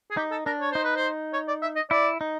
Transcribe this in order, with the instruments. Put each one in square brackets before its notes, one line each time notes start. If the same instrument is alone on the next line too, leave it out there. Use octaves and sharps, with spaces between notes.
[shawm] G#4
[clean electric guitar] D#4 [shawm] G4
[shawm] A4
[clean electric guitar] D4 [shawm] A#4
[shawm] C#5
[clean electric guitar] D#4 [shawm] C5
[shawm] B4
C5
C#5
D5
E5
D#5
[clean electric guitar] E4 [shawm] D5
[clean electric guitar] D#4